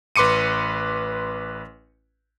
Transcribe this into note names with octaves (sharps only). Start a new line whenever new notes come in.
A1 B4 C6 D6 C#7 D#7